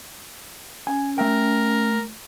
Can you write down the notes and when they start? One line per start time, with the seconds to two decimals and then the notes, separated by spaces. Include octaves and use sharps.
0.87 C#4 G#5
1.18 A3 A#4 E5 G5